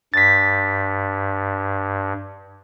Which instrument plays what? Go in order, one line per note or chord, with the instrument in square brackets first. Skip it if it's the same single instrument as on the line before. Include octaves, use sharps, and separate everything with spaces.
[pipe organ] G2 [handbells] A6 B6